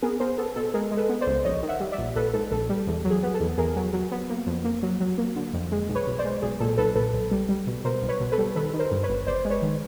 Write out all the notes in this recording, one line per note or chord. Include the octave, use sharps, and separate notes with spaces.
B3 G#4 A#4
B3 A#4 C5
B3 A4
B2 A4
G#3 G#4 A#4
G#3
A4 B4
B3
C5 D5
C#2
A#1 C#5 D#5
D#3
E5 F#5
G3
D5 E5
A#1
A#1 A4 B4
G#2 A4
A#1 A4
G3
E2
F#3
G#4
B3
A4
E2
E2 G#4 A#4
F#3
F#3
B3
A#3
F2
A#3
F#3
F#3
A#3
D3
F2
G#3
B1
B4 C#5
B1
C5 D5
G#3
B1 G#4
A#2 A4
B1 A4 B4
A#2 A4 B4
B1
G3
G3
B2
B2 A#4 C5
B1
B4 C#5
B2
A4 B4
G3
D#3 A4 B4
D#3
A#4 C5
G2
B4 C#5
G1
G1 C5 D5
G#3
B4 C#5
D#3